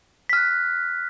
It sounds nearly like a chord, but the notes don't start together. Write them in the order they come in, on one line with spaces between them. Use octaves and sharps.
B6 F6 F#6